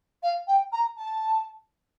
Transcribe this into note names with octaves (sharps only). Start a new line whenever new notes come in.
F5
G5
A#5
A5